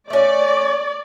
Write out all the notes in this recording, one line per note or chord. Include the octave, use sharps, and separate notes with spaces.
A3 C#4 D5